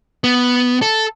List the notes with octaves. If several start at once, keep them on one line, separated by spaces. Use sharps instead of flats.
B3
A4